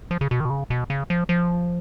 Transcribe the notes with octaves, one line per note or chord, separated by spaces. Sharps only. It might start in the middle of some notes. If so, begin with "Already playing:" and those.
F3
C#3
B2
D#3
B2
C#3
B2
C#3
F3
F3